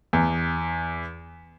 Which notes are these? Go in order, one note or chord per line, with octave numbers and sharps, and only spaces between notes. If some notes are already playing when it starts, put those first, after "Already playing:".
E2